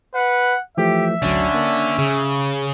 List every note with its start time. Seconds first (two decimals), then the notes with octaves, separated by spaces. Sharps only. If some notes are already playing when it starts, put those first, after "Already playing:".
0.15 B4 F#5
0.77 E3 F3 A3 G4 E5
1.23 G#1 D2 D3 F#3 C#4
1.55 A#3
1.98 C#3 G#4